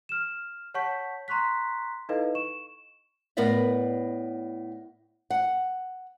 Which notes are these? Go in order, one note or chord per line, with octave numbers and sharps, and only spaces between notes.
F6 E7
C#5 F#5 A5 C#6 G6 B6
A#5 C6 C#6 F#6 B6
D#4 E4 A4 B4 D#5 F5
C#6 E7
A2 B3 A#4 B4 D5 E5
F#5